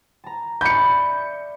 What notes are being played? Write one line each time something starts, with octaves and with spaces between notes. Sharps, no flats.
A5 A#5
D5 E5 B5 G6 C#7